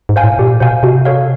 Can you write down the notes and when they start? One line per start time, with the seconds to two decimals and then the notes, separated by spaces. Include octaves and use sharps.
0.09 G#2
0.16 C5 F5 G#5
0.24 A2
0.39 A#2 G4
0.60 B2 C5 F5 G#5
0.83 C3 F#4
1.05 A4 C#5 F5